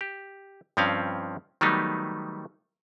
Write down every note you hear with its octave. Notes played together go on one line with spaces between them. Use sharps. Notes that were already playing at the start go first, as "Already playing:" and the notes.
G4
G2 F3 C4 C#4 F5
D#3 F#3 G3 A3 B3 D#4